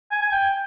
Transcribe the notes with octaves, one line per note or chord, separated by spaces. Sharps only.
G#5
G#5
G5